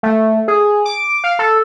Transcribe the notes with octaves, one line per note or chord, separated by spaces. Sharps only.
A3
G#4
D6
F5
A4